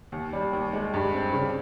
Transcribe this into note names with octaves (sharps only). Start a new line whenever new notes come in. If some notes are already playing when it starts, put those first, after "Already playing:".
D#2
G3
D#2
G#3
G2
C4
C#3